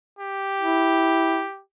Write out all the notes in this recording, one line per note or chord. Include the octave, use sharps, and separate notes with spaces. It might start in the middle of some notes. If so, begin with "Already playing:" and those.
G4
E4